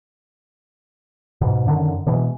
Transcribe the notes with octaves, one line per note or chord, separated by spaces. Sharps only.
G#2 B2
F#2 D3 D#3
B2 E3 G#3